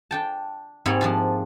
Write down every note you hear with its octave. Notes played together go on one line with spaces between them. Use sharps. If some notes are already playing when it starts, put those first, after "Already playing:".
D4 G5 A5
G#2 G3 A#3 C4 C#5 G#5
F3 D4 F4